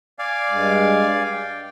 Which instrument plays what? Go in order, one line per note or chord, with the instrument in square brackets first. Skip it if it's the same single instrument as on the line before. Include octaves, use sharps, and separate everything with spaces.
[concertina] D5 F5 G#5
[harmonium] G2 G#3
G5